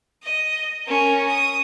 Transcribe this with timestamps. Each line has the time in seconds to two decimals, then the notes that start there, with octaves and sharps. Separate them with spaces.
0.23 D#5
0.86 C#4 A#4
1.28 D#6